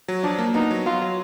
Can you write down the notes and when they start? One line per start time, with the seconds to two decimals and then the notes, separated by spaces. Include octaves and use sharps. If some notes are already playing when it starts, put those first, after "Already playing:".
0.08 F#3
0.23 F3 D4
0.38 A#3
0.54 B3 D#4
0.71 F#3
0.86 F#3 F4
1.02 F#3